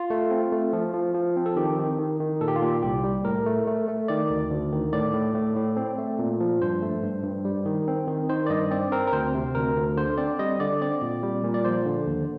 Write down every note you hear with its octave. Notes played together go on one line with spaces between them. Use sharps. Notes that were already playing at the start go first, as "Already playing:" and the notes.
Already playing: F4
A3
C4
A3
F3
F3
F3
C4
A4
D#3 G4
D#3
D#3
D#3
A#2 A4
G4
F4
A#2 G4
C2 G4
G3
A2 A#4
A3
A3
A3
D#3 D5
D2
D2
D#3
A2 D5
A2
A2
A2
C4
A3
A#2
F3
G2 C5
A3
G2
G2
G3
D#3
C4
D#3
D#3 C5
D5
G2 D#5
C4 D5
C4 A#4
A#4
D2 C5
C3
D2 A#4
D2
D3 C5
C4 D5
G3 D#5
D3 D5
C4 D5
A#2
G3
A#2
D5
F3 C5
D3
D#2